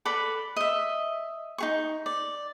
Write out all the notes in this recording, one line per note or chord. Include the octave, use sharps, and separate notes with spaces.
A4 B4 D5 B5
D#5 E5
D#4 G#4 C#6
D5